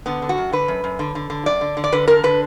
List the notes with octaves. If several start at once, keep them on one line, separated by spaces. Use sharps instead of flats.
D3 B3
D3
F#4
F#2
D3 B4
F#2
F#2
D3
D3
D3
F#2 D5
D3
D3
D5
D3 B4
D3 A#4
D3 B4